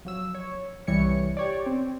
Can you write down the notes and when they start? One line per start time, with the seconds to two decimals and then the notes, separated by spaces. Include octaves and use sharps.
0.05 F3 F#3 E6
0.35 C#5
0.87 C2 E3 G3 C#5 C#7
1.37 G4 C#5 D5
1.66 C4